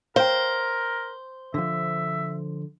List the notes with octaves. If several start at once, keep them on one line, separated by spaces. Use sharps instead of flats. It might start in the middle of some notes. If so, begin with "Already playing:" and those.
A#4 C5 F5 G5
D3 F3 E5